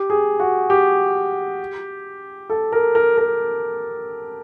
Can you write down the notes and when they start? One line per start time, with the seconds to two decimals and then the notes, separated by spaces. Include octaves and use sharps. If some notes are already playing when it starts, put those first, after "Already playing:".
Already playing: G4
0.10 G#4
0.40 F#4
0.70 G4
2.50 A4
2.72 A#4
2.95 A#4
3.18 A#4